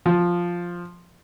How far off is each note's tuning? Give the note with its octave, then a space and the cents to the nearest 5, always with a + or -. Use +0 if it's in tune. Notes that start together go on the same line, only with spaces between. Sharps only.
F3 +5